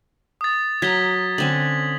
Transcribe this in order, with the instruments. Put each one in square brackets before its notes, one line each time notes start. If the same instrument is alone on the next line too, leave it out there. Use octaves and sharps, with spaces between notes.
[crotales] D#6 A6
[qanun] F#3 A#5 [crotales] G#6 B6 G7
[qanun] D3 C4 C#4 [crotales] F#7